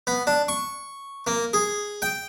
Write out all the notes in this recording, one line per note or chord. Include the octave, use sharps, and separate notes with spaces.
B3
D4
C#6
A#3
G#4
G5